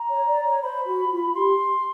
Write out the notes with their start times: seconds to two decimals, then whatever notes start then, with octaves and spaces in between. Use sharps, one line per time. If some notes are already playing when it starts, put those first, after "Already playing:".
Already playing: A#5
0.09 C#5
0.27 D5
0.45 C#5
0.62 C5 B5
0.87 F#4
1.11 F4
1.35 G4 C6